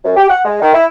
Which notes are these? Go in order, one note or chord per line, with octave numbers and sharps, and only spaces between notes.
F#2
G4
F#5
G#3
D#3
E4